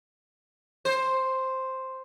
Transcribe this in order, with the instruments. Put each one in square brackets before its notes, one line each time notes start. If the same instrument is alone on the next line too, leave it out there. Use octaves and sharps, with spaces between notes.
[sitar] C5